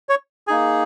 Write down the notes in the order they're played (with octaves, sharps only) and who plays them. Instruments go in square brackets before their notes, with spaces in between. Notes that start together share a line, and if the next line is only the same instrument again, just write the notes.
[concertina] C#5
A#3 D#4 G#4 G#5